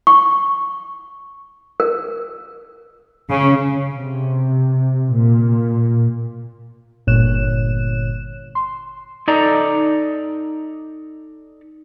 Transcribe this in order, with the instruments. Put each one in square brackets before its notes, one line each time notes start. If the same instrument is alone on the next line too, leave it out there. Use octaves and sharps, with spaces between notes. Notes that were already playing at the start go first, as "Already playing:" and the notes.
[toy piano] C#6
A#4
[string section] C#3
[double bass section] C3
A#2
[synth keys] G1 A#2 C#5 F#6 E7
C6
[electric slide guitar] D#4 A4 D5 A#5